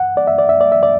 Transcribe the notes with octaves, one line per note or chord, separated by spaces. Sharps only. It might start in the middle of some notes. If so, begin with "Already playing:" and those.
Already playing: F#5
D5
E5
D5
E5
D5
E5
D5